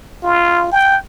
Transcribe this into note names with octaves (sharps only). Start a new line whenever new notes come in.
F4
G5